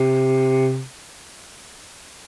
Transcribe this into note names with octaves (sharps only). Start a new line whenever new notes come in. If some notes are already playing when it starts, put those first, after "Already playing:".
Already playing: C3